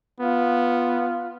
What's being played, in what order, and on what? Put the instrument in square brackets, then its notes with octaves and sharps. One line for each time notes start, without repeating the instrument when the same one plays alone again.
[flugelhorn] B3 [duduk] F4